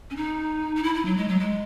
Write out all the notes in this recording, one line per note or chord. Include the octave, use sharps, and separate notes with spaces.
C#4
D#4
D#4
E4
E4
F#3
G#3
F#3
G#3